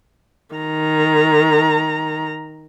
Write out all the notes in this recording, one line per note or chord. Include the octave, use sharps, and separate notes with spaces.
D#3 A#5